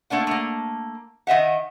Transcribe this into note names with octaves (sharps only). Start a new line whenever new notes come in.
A3 A#3 D4 F#5
A3 A#3
D#3 D#5 E5 F#5